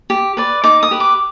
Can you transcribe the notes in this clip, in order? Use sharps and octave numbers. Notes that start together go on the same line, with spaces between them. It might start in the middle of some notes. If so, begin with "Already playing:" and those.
G4
B4 D5
D#4 D6
D#6
G4 B4
D6